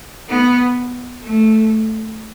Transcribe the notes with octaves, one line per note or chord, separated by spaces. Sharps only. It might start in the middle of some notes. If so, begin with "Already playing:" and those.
B3
A3